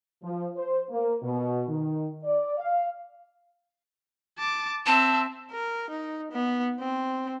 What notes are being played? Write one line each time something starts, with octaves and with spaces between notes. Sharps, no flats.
F3
C5
A#3
B2
D#3
D5
F5
A5 D6
C4 E5 A5
A#4
D#4
B3
C4